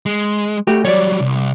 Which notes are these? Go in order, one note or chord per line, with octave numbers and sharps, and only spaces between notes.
G#3
A3 F#4 G4
F#3 G3 C#5 D5
C2